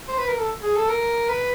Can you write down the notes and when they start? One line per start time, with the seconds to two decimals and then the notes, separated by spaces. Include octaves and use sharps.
0.08 C5
0.18 B4
0.28 A#4
0.38 A4
0.62 G#4
0.76 A4
0.88 A#4
1.29 B4